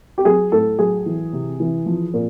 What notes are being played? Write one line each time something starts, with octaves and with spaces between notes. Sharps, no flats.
G4
F#3 G#4
A2 A4
F#3 G#4
E3
C3
E3
F3
A#2